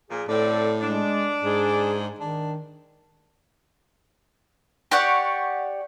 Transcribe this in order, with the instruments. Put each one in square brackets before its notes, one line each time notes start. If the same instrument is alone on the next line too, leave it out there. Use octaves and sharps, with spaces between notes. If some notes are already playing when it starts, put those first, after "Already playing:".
[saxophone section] A#2 F3 [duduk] G#4
[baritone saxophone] A2 [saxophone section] D3 C4 D5 [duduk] A4
[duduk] G#3 [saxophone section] D4
[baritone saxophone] G#2 [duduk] G#4
[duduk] D#3 [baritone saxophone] D4
[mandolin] G4 C#5 D5 F#5